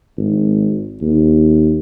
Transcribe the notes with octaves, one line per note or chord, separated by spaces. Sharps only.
G#1
D#2